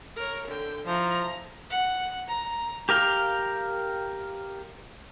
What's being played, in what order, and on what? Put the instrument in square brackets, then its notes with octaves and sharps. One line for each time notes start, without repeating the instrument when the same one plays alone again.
[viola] A#4 C#5
D3 G5
[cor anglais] F3 [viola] E4 A#5
[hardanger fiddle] F#5
A#5
[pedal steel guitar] G4 A#4 F5 G5